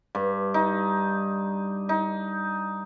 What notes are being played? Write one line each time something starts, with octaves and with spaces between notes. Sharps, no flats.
G2
D#4
D#4